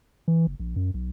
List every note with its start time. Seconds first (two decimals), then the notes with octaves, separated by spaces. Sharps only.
0.28 E3
0.47 F#1
0.60 A#1
0.76 F#2
0.94 B1